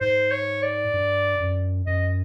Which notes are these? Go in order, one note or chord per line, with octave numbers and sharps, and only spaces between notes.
G#2 C5
C#5
D5
G2
F#2
F#2 D#5